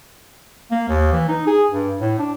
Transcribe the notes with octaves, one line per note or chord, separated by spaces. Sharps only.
A#3
D#2
E3
D#4
G#4
G2
A2
D4